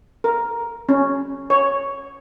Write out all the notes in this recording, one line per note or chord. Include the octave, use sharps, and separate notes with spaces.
A#4
C#4
C#5